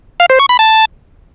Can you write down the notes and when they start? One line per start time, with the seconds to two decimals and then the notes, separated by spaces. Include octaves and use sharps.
0.20 F5
0.30 C5
0.39 C#6
0.49 B5
0.59 A5